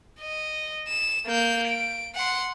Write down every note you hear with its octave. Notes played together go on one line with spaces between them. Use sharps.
D#5
E7
A#3 G6
D7
F#5 C6